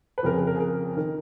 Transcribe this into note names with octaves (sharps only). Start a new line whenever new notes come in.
B4
F2 C#3 F3 A#4
G#4
A#4
G#4
A#4
D#3 A#4